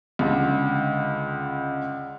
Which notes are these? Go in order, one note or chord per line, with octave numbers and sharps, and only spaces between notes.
C#2 D3